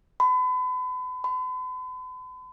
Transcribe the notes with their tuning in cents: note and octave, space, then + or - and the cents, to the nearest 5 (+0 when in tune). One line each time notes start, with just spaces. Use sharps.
B5 +35
B5 +45